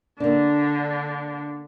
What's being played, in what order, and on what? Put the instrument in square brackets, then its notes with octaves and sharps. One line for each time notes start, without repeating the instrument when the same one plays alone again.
[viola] D3 [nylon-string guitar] A#3 D4